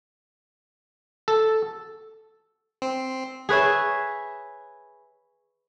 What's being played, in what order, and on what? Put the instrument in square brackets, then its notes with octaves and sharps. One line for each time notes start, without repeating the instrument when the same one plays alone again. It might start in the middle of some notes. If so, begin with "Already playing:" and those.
[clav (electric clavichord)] A4
[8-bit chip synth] C4
[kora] G#4 B4 C#5 E5